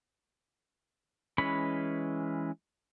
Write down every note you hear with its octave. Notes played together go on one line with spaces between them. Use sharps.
E3 G#3 C#4 B4 B5